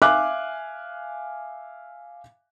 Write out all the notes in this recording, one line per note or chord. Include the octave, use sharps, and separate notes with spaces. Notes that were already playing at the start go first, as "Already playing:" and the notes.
E5 F5 G#5 D6 F6 F#6